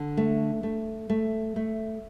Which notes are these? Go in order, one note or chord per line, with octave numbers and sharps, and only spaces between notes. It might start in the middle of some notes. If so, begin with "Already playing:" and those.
Already playing: D3
A3
A3
A3
A3